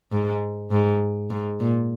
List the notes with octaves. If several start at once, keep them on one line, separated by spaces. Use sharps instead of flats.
G#2
G#2
G#2
A#2